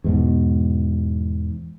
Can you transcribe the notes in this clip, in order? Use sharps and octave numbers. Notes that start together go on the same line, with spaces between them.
E2 G#2 B2